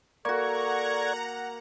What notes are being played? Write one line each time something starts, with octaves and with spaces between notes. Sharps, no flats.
A#3 F#4 A4 D5 F#5 A#5 C#6 G#6